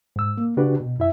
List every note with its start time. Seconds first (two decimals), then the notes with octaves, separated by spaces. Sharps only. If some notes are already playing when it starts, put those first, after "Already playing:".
0.16 G#2 E6
0.38 A#3
0.57 C#3 D4 F#4 G4 B4
0.80 B2
0.98 F#2 E4 E5